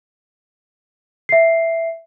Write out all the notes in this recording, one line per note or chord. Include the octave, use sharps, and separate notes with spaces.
E5 C7